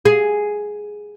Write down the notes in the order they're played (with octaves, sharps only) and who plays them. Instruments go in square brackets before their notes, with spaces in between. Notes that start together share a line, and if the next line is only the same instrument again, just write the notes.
[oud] G#4